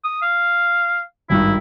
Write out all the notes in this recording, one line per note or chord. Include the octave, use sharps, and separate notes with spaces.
D#6
F5
G#1 G2 D#3 E4